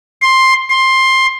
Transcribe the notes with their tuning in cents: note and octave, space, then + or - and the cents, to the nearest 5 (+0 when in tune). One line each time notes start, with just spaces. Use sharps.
C6 +10
C6 +15